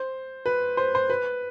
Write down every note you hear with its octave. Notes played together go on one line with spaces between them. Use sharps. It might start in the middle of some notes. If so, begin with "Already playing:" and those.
Already playing: C5
B4
C5
C5
B4